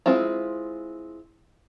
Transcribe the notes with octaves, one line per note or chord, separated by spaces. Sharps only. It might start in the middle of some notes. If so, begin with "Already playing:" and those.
G#3 C4 E4 F4